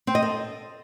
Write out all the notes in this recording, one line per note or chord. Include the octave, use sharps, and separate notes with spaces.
C4
D#5
A4